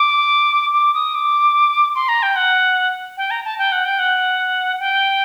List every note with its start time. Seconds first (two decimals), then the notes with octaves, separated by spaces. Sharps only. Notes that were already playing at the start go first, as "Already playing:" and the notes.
Already playing: D6
0.73 D6
0.94 D#6
1.15 D6
1.95 C6
2.09 A#5
2.23 G5
2.36 F#5
3.17 G5
3.31 A#5
3.45 A5
3.58 G5
3.72 F#5
3.85 G5
3.99 F#5
4.80 G5